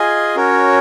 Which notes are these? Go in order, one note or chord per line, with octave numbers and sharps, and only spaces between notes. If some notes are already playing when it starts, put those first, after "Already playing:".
Already playing: F4 G#4 D#5 G#5
C#4 F#4 A#4 C#5